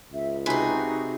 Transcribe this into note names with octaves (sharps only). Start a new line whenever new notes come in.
C#2 E5
C3 D#4 F#4 G#4 B4 G#5 B5